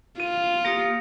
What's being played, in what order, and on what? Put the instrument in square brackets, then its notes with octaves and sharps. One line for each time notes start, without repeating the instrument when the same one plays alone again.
[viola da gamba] F4 [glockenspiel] D#7
[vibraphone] A#3 G4 D#6 [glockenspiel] A#6 C#7